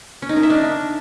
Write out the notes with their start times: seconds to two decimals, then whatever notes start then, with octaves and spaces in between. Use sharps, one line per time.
0.22 C#4
0.29 D#4
0.36 A#4
0.43 E5
0.50 D4